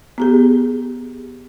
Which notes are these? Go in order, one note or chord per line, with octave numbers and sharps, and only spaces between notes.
B3 G4 G#4